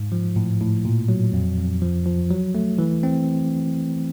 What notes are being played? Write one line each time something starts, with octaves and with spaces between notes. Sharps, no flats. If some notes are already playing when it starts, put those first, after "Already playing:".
Already playing: G#2
F3
A2
A2
A#2
F#3
F2
F2
F3
F3
F#3
A3
E3
C4